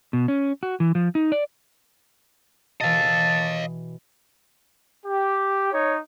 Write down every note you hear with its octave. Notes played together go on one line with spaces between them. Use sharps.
B2
C#4
F#4
E3
F3
D#4
D5
B2 E3 D#5 F5 A5
G4
D#4 C#5